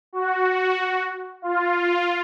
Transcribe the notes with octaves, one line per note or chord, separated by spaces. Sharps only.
F#4
F4